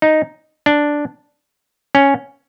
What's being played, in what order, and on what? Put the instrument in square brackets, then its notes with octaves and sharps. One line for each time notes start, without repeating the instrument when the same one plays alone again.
[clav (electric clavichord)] D#4
D4
C#4